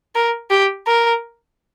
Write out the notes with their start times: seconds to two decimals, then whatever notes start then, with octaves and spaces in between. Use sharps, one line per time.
0.15 A#4
0.51 G4
0.87 A#4